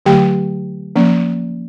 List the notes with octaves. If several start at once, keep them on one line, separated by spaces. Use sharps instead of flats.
D3 F#3 A3 G4 G5
F3 A#3 C#4